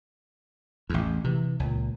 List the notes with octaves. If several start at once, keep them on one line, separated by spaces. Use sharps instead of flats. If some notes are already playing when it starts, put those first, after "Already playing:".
A1 E2
C3 E3
C#2 A#2